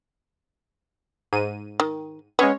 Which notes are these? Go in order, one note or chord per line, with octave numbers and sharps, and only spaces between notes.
G#2 D#7
D#3
G#3 B3 C#4 C#5